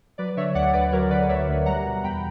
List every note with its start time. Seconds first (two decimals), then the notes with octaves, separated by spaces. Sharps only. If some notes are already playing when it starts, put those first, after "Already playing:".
0.18 F#3 B4 D5
0.37 D3 C#5 E5
0.55 D2 D5 F#5
0.73 D2 B4 D5
0.92 F#3 A#4 C#5
1.11 D3 B4 D5
1.29 D2 C#5 E5
1.48 D2
1.66 G3 F#5 A#5
1.85 B2
2.03 E2 G5 B5